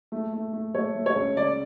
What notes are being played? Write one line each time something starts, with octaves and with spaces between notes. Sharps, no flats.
A3
A3
A3
A3 C#5
A3
C#5
C#2
C#3 D5